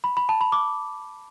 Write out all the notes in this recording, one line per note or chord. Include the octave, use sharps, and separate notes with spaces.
B5
B5
A5
B5
D6